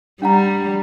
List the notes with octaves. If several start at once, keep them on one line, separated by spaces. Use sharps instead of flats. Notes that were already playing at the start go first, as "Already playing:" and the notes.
G3 D4 F#5 A#5